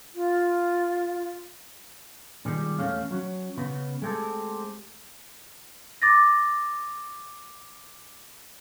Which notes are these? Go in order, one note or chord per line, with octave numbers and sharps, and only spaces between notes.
F4
A#2 D#3 G3 G#3
E2 A3 C#4 F5
F#3 C#4
C#3 B3
G#3 A3 C4 G4 A4
D6 A6 A#6